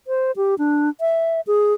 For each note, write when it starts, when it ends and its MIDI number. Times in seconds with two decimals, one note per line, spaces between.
0.07 0.31 72
0.36 0.55 67
0.58 0.90 62
1.00 1.41 76
1.47 1.74 68